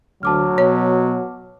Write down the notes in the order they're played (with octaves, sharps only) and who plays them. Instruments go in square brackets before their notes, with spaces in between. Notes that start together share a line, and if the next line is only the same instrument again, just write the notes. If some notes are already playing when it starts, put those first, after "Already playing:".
[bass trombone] D2 [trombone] F#3 [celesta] A5 D6 F6
[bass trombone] B2 [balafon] C#5